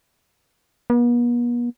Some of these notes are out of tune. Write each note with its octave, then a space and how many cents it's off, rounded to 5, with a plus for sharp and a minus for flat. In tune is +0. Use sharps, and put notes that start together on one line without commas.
B3 -45